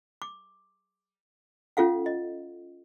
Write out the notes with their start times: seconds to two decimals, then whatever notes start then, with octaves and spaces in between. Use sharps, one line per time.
0.22 D6
1.77 C#4 F4 A4 F5 F#5
2.06 D#5